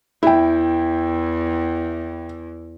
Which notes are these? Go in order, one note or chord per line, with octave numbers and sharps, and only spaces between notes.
E2 E4 G5